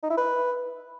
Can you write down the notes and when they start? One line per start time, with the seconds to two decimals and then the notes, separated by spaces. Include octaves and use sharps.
0.03 D#4
0.10 E4
0.17 B4